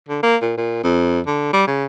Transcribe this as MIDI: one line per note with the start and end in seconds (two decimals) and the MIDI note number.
0.09 0.22 50
0.23 0.36 58
0.42 0.53 46
0.58 0.79 46
0.84 1.20 41
1.27 1.49 50
1.53 1.67 55
1.67 1.86 49